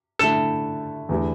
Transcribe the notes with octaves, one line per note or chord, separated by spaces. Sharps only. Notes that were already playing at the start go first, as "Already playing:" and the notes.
D3 A3 E4 A4
E2 D3 A3 E4 G4